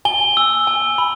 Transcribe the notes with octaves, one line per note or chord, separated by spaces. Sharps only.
G#5 G7
E6
G#5
B5